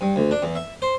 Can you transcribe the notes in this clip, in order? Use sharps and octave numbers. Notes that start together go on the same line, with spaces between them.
G2
D2
D4
E2
E5
C5